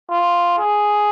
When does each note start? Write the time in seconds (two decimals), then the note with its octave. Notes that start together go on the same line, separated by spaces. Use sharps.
0.10 F4
0.59 G#4